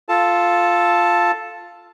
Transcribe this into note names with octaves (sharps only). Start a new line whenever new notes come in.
F4 A4 A5